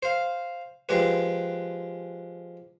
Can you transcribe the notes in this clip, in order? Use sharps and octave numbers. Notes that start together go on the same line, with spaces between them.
C5 F5
F3 G#3 G4 B4